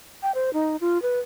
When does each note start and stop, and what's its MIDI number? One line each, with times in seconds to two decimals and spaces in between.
0.23 0.31 79
0.35 0.50 72
0.53 0.76 63
0.81 1.01 65
1.02 1.19 71